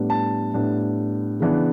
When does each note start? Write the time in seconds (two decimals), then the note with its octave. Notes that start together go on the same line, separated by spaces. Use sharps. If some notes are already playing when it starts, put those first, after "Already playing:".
Already playing: A2 G3 B3 D4
0.10 A5
0.54 A2 G3 B3 D4
1.40 C#3 E3 B3 D4